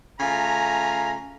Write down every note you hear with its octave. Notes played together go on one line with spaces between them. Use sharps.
C#3 A3 F4 G#5 A#5